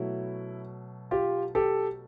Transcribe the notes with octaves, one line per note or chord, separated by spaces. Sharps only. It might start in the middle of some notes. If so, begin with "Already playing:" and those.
Already playing: B2 F#3 A3 E4
F4 G4
G4 A4